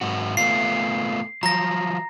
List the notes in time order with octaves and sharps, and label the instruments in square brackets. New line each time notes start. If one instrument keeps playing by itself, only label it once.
[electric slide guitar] G#2 F#3 F#4
[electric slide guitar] A3 B3 F4 [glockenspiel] C7
[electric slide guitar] F3 F#3 [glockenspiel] A#5 A#6